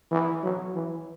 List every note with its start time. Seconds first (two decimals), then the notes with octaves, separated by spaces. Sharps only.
0.11 E3
0.43 F#3
0.75 E3